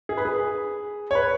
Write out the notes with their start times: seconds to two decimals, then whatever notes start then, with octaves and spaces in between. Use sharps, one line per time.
0.09 G#4
0.17 B4
0.25 G#4
1.11 C#5
1.15 B4